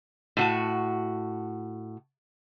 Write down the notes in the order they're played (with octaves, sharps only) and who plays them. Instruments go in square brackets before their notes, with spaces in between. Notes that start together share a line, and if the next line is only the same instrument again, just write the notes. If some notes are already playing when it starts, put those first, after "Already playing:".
[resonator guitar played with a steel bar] A2 F#4 A5